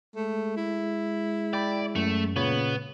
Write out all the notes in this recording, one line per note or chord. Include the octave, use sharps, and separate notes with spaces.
G#3 A3
E4
D5 G5 B5
F#2 A3
A#2 C#3 B3 C#5